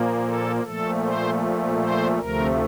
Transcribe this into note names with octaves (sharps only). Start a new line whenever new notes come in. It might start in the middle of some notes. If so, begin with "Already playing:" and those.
Already playing: A#2 F3 A#3
A4
A#2 F3 A3 A4
C5
C5
D2 C3 F3 A3 A#4